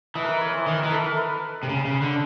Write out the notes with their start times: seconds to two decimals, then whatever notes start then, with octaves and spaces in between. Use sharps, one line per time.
0.15 E3 D#5
0.24 A#4 B4
0.41 C#5
0.54 C5
0.66 D#3 B4
0.79 E3 A#4
0.92 A4
1.05 A#4
1.17 B4
1.63 C3
1.69 C#3
1.85 C#3
2.02 D3